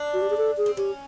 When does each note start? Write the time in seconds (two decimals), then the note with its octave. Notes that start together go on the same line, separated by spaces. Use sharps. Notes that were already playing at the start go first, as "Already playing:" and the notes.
Already playing: D4
0.13 F#4
0.22 G4
0.30 G#4
0.37 A4
0.57 G#4
0.66 C4
0.77 C#4 G4